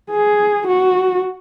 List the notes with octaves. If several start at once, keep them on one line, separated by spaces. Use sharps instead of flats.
G#4
F#4